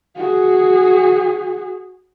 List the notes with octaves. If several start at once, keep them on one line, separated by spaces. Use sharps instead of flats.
F#4 G#4